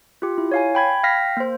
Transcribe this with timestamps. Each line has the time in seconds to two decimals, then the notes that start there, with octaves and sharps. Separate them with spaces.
0.22 F4 G4
0.38 E4
0.52 C#5 F5 G#5
0.75 G5 B5 G#6
1.03 F5 G5 F6 A#6 B6
1.37 A#3 C5